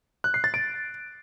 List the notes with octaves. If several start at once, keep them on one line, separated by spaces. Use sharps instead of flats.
F#6
C7
A6
D7